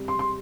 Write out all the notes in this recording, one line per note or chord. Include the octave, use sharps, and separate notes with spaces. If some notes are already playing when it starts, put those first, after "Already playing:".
Already playing: C3 G3
C6
C6